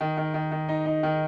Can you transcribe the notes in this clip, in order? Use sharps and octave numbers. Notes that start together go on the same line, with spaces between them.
D#3
D#3
D#3
D#3
D#4
D#4
D#3